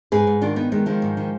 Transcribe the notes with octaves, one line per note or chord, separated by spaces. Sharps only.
G#2 G#4 B4
G#2
D#3 D4 F4
D#3 B3 D#4
D#3 G#3 B3
D#3 F3 G#3
G#2
D#3